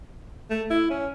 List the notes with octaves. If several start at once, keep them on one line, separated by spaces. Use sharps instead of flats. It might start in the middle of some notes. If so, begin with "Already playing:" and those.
A3
E4
C#4